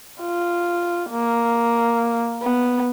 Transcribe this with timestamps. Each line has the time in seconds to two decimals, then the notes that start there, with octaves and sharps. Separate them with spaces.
0.21 F4
1.11 A#3
2.42 B3